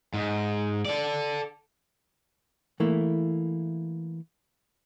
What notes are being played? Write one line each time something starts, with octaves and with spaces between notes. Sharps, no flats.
G#2
A4 D5
E3 A3 A#3 E4